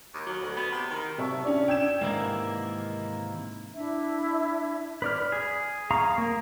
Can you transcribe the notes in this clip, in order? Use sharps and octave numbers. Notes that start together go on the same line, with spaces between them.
D#2
F#3
D2
B3
C3
D#3
C3 E5 A5 C#6
C#4 D4 D5
D4 G5 E6 G#6 E7
G#2 C3 D#3 E3 A#3 E4
D4 E4 E5
B4 D5 F6
G#4
F5 A#5 C#6 D#6
A#3